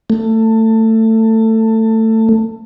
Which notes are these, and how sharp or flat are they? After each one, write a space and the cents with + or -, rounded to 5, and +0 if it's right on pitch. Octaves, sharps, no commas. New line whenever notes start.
A3 +20